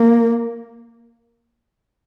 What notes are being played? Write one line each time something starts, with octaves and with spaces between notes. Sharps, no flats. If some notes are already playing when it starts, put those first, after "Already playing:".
Already playing: A#3